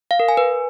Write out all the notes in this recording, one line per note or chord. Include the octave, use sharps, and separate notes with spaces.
F5
A#4
G#5
B4